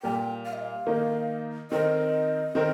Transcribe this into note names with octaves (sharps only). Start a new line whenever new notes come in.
A#2 G3 A#3 G5
F5
D#5
F5
D#3 A#3 D#4
D#3 C4 D#4 A#4 D#5
D#3 C4 D#4 A#4